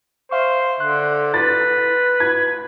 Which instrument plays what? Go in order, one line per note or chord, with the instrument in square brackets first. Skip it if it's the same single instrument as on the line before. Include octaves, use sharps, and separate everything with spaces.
[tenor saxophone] C5 [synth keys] E5 F5 C#6
[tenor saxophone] D3 [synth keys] C6 F#6
[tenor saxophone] B4 [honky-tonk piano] A6
[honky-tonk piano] G#6